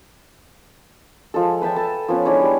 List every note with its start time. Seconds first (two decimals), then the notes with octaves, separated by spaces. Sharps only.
1.34 F3 G#3 A4
1.61 B4 E5 G5 A5
1.76 A4 A5 D#6
2.08 F3 B3 C#4 B4
2.25 G#3 D4 E4 C#5
2.43 G3